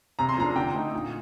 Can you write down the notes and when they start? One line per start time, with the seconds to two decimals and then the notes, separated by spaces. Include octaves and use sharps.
0.19 C3 A#5
0.29 C6
0.38 F3 A#3 D4 A#5
0.56 D3 G5
0.75 A3 D#4
0.93 A#2